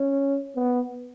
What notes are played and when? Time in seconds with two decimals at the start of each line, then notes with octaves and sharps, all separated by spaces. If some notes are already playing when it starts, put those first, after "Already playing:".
Already playing: C#4
0.56 B3